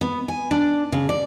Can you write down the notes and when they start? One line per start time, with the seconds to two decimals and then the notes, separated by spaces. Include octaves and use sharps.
0.01 B3
0.28 G#5
0.51 D4
0.92 C#3
1.09 D5